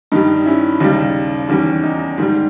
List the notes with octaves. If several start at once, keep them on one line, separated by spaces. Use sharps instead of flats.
G2 D#3 G3 D#4
C#4 E4
D#2 C#3 G3 D#4
E2 D#3 G3 C#4
D#4
G#2 D#3 G3